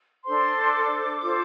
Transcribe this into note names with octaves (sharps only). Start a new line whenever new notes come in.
D4 A4 C5 C6
D6
F4 A4 C5